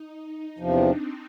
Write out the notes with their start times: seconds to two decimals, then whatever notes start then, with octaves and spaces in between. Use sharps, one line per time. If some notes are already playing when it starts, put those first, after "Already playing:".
Already playing: D#4
0.59 E2 C3 F3 D4
0.90 C4